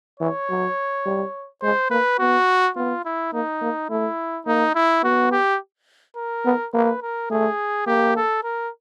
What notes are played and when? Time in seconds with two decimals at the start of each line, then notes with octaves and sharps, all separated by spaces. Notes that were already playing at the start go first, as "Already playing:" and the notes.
0.20 E3 C#5
0.49 F#3
1.05 G3
1.62 G#3 C5
1.90 A#3 B4
2.19 B3 F#4
2.76 B3 F4
3.05 E4
3.33 A#3 D#4
3.62 A#3
3.90 A3 E4
4.46 A#3 D#4
4.75 E4
5.03 B3 F#4
5.32 G4
6.16 A#4
6.45 B3
6.74 A#3 B4
7.02 A#4
7.30 A3 G#4
7.87 A#3 G4
8.16 A4
8.44 A#4